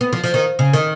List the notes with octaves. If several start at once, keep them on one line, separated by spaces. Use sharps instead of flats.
B3
F3
F3
D#3
C#3
D#3